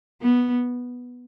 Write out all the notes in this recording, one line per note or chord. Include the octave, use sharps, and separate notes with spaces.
B3